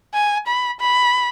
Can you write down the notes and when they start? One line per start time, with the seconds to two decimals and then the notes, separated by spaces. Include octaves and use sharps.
0.14 G#5
0.47 B5
0.80 B5